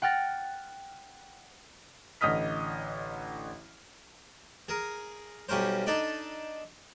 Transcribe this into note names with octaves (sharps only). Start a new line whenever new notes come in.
F#5 G5 F6 A6 A#6
A1 D3 D#5 D#6 F6 B6
G#4 A#4
B1 G3 C#4 A#4 C5
D4 D#4 A4 D5